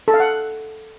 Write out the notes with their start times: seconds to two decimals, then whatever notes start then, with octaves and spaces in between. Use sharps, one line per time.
0.08 A4
0.14 F5
0.20 F#5